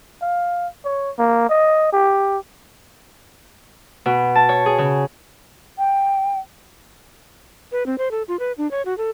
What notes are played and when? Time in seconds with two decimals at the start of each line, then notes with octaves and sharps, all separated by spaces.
0.22 F5
0.85 C#5
1.18 A#3
1.49 D#5
1.93 G4
4.06 B2
4.35 A5
4.49 C#5
4.66 G#4
4.78 C#3
5.79 G5
7.72 B4
7.86 C4
7.98 C5
8.11 A4
8.28 F4
8.39 B4
8.58 D4
8.71 C#5
8.85 F#4
8.98 A4